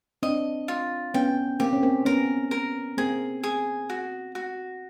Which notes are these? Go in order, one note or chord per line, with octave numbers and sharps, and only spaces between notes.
C4 D4 D#5
F4
B3 C#4 G5
A#3 C4 G4
C#4
A#3 C4
B3 C#4 A#4
A#4
A#3 C4 G#4
G#4
F#4
F#4